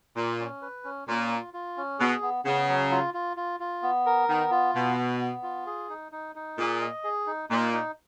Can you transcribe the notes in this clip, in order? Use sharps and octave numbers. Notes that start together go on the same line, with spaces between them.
A#2 F4
C#4
B4
C#4
A#2 C#4
F4
F4
C#4
B2 G#4
B3
C#3 B3
F#3
F4
F4
F4
F4
B3
A#4
D#3 B3
F4
B2 B3
B3
B3
F4
G#4
D#4
D#4
D#4
A#2 G#4
D#5
G#4
D#4
A#2 D#4
D#4